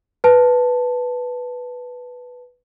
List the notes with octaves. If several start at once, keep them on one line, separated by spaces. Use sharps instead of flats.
B4 A5